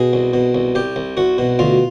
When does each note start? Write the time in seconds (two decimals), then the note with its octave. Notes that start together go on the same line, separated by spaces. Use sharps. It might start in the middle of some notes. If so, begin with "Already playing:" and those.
Already playing: B2 G#4
0.13 C2
0.33 B2
0.55 C2
0.75 C2 G4
0.96 C2
1.17 C2 F#4
1.38 B2
1.59 D2 F4